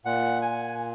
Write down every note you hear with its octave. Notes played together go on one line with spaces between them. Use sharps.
A#2 F#5
G#5